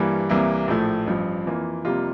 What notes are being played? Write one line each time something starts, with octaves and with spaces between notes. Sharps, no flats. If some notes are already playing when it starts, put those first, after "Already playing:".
Already playing: G2 E3 G3 A#3 D4
C2 C3 E3 A#3 E4
A#1 A2 F3 A3
A1 G2 F3
F2 E3 A#3 F4
F2 C3 G3 A#3 F4